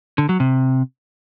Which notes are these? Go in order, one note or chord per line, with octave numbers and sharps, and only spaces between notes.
D3
F#3
C3